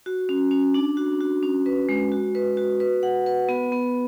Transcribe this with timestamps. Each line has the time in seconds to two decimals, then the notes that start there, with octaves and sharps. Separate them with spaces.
0.06 F#4
0.29 C#4
0.51 C#4
0.74 D4
0.97 F#4
1.20 F#4
1.43 C#4
1.66 B4
1.89 G#3
2.12 F#4
2.35 B4
2.57 F#4
2.80 B4
3.03 F#5
3.26 B4
3.49 B3
3.72 B3